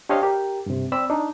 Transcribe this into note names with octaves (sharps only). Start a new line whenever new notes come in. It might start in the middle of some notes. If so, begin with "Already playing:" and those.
D4 G4 C5 C#5 D#5 F5
G4 A#4
G2 C3
C4 D5 B5 E6
D4 D#4